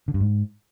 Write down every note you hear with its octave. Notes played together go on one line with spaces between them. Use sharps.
D3
G2
G#2